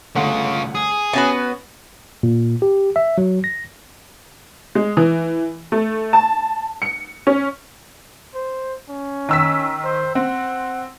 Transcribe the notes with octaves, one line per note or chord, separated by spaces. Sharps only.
G1 C#3 A3 F4 F#5
G#4
B3 C#4 F#4 B4
A#2
G4
E5
F#3
A#6
G#3
E3
A3
A5
C#7
C#4
C5
C#4
D#3 E6 B6
C5
C4 F#5